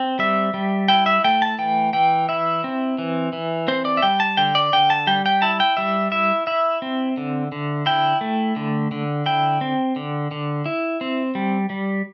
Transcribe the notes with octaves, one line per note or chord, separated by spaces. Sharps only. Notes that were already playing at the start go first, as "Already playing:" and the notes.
Already playing: C4
G3 E5
G3
E4 G5
E5
A3 G5
A5
E3 G5
E3 G5
E4 E5
C4
E3
E3
C4 C5
D5
E5
G3 G5
A5
D3 G5
D5
D3 G5
A5
G3 G5
G5
E4 A5
G5
G3 E5
E4 E5
E4 E5
C4
D3
D3
E4 G5
A3
D3
D3
E4 G5
C4
D3
D3
E4
C4
G3
G3